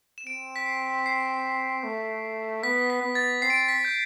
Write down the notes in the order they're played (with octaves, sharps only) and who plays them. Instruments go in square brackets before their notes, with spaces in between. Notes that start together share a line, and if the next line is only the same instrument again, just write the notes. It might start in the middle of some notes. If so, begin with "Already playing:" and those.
[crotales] E7
[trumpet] C4 [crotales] D7
[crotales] B6
C7
C7
[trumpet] A3
[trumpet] B3 [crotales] B6
[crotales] B6
[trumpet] B3
[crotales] A6
[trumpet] C4 [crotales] C7
[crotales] D7
C7
B6
G6